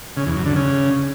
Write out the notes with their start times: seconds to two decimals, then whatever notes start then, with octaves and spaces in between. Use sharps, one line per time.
0.17 C#3
0.26 E2
0.36 F#2
0.46 D3
0.55 C#3